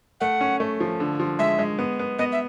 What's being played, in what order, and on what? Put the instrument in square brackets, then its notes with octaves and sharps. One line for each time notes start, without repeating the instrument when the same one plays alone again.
[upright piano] A3 [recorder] F#5
[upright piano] C#4
A3
F3
D3
F3
[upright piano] G#3 [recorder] E5
[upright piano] G#3
B3
B3
[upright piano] B3 [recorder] D#5
[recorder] E5